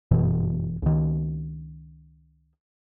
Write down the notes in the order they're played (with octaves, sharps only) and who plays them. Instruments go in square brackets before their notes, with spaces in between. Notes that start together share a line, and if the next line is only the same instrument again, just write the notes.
[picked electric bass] G1 F#2 B2 E3
C#2 D#3